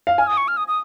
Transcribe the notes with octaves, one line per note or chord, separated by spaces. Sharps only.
F5
G#5 F6
D#6
C#6
F6
D#6
D#6